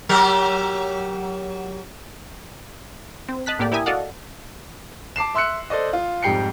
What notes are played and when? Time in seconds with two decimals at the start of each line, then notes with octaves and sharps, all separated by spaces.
0.09 F#3 G4 A#4
3.29 C4
3.46 D#5 A5 F#6 B6
3.59 A2 A#3 G4 D5
3.72 E4 G4 A#4 E5 G#5 D#6
3.86 F#4 A4 D5 D#5 F5 F#5
5.16 A5 D6 C7 E7
5.35 E5 C6 E6 F#6 C#7
5.70 A4 C5 D5 D#5
5.93 F4
6.23 F2 G#2 G3 G5 C7 C#7